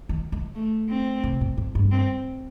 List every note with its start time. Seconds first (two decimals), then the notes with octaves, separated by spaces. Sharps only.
0.09 D#3
0.32 D#3
0.55 A3
0.89 C4
1.24 C3
1.41 A#2
1.57 A2
1.75 G2
1.91 C4